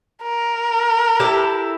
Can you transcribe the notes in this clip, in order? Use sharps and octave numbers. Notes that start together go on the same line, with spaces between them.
A#4
E4 G4 A4